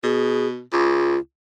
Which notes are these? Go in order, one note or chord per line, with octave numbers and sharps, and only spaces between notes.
B2 G#4
C#2 F4